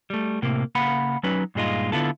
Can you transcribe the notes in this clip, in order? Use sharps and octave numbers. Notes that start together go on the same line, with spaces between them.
G3 A3
A2 C3 A#3
C#3 A#3 F5 F#5 B5
F#3 C#4 D#4 B4
G2 A#2 G#3 D#4 F4
D3 B3 E4 F4 A4